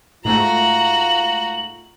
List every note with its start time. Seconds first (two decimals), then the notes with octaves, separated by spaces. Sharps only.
0.25 G#2 A3 F4 F#4 A#5 F#7